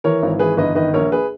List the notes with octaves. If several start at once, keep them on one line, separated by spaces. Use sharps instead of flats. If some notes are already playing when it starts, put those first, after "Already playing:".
E3 A#4 C#5
G#1
E3 G#4 B4
G1 B4 D#5
D#3 B4 D#5
A#1 A#4 C#5
G#4 B4